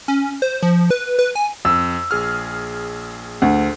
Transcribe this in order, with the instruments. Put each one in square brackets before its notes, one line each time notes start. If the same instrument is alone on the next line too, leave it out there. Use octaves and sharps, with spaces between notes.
[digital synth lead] C#4
C5
F3
B4
B4
G#5
[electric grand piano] F2 [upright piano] E6
[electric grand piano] A#1 G#4 F6
[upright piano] D2